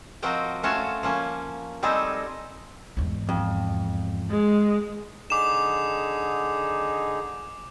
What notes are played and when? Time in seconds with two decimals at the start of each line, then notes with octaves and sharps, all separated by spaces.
0.22 F3 C4 F#4 A#4 D#5 G5
0.63 A3 C#4 F4 F#4 C#5 A5
1.03 F3 A#3 C#4
1.83 G3 C4 D#4 G#4 A4 D#5
2.97 E2 G#2
3.29 F2
4.30 G#3
5.30 D3 D#4 G#4 D6 E7